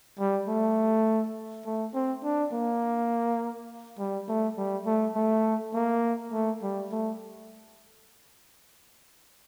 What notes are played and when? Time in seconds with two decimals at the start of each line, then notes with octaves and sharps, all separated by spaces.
0.19 G3
0.48 A3
1.66 A3
1.94 C4
2.24 D4
2.52 A#3
3.99 G3
4.28 A3
4.57 G3
4.86 A3
5.15 A3
5.74 A#3
6.32 A3
6.63 G3
6.92 A3